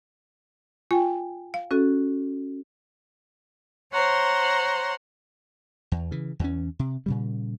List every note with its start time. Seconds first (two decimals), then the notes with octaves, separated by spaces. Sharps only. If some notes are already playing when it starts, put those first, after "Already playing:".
0.91 F4 G5 G#5
1.54 F5
1.71 C#4 F#4 A4
3.93 C5 C#5 F#5 A#5 C6
5.92 E2
6.11 C#3 E3
6.39 E2 E3 C#4
6.79 C3
7.06 A#2 C#3 G3